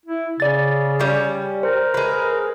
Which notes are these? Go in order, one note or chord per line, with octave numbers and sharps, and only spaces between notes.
E4
C#3 D5 A6
G3 C#4
A#4 C5
G#3 B4